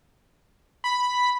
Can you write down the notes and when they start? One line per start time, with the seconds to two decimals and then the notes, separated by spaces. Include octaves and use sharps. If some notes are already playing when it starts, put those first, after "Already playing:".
0.84 B5